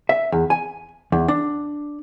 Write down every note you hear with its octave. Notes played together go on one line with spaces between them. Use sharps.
E5
E2
G#5
E2
D4